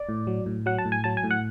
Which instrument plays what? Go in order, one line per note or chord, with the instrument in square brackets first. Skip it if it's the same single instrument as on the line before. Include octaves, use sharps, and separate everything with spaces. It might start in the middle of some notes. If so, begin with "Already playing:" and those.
Already playing: [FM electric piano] D5
A2
F#3
A2
F#3 F#5
A5
A2
G#5
F#3 A5
G#5
A2
F#5